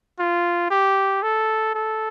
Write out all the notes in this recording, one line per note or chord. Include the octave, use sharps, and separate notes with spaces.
F4
G4
A4
A4